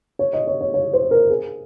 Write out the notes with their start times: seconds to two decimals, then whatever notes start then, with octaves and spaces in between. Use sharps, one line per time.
0.19 C#5
0.33 D#5
0.47 C#5
0.61 C#5
0.74 C#5
0.93 C5
1.11 A#4
1.30 G#4